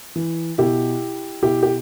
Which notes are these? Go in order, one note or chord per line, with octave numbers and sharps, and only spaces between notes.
E3
B2 E4 G4
B2 E4 G4
G4